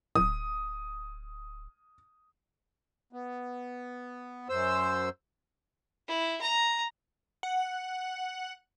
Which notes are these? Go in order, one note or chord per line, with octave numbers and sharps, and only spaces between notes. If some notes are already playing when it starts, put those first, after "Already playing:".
D1 D#6
B3
F#2 C5 E6
E4
A#5
F#5